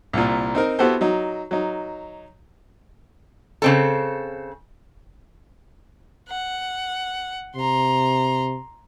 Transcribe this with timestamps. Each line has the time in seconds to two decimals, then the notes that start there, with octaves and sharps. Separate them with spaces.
0.13 C2 A#2
0.55 C4 D#4 A#4
0.79 B3 E4 F#4 G4 A4 C5
1.01 F#3 D#4
1.51 F#3 D#4
3.62 C#3 C4 A4
6.29 F#5
7.56 C3 A#5 C6